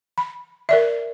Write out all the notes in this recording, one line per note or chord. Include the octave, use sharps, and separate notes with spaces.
B5
A#4 D5 E5